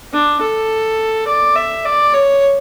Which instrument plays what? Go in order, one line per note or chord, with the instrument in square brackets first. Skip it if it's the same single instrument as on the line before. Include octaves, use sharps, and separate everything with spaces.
[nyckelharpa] D4
A4
D5
E5
D5
C#5